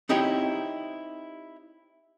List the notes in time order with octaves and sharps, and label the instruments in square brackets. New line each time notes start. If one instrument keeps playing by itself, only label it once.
[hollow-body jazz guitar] C4 D#4 E4 G4 C#5